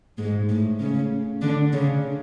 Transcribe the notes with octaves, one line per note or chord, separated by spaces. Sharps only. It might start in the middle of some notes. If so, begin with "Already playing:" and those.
G#2 G#3
A2 A3
C#3 C#4
D3 D4
C#3 C#4